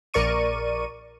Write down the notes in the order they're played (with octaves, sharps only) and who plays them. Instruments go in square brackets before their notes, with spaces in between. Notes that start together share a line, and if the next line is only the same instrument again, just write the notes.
[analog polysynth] A#1 A#4 D5 C#6 D#7